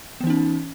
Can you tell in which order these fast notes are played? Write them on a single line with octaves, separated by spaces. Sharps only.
B3 E3 D#4 C#4